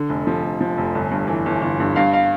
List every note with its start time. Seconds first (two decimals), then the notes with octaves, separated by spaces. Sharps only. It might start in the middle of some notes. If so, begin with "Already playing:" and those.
Already playing: D3
0.09 F1
0.27 F3
0.43 F1
0.61 F3
0.78 F1
0.95 G1
1.11 G2
1.28 E3
1.46 G1
1.62 G1
1.80 G2
1.96 G2 F5
2.13 F5